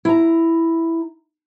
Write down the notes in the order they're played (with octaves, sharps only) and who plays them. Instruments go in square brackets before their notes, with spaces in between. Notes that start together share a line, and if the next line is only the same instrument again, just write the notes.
[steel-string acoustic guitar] E4 A#5